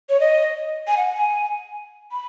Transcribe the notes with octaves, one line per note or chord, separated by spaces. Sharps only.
C#5
D#5
G#5
F#5
G#5
B5